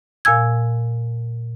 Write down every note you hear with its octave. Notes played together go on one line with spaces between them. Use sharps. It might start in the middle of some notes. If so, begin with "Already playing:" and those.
A#2 F5 G#5 E6 G#6